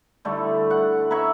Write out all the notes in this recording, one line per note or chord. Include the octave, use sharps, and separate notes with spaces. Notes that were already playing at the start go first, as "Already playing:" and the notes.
D3 G3 A3 E4
F#5
C#5 E5 A#5 B5